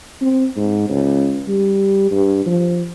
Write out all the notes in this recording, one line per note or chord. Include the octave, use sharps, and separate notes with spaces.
C4
G#2
C#2
G3
G2
F3